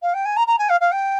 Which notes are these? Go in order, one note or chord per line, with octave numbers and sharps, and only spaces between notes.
F5
G5
G#5
A#5
A#5
G#5
F5
F5
G5